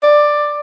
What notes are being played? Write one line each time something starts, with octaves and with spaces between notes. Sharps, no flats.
D5